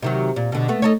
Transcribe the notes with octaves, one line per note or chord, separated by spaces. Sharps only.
C3 D#3 F#3
A#2
B2 D3
A3 B3
D#4 A4 C#5